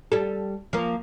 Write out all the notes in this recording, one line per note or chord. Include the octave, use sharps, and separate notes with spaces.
G3 A4
F3 A#3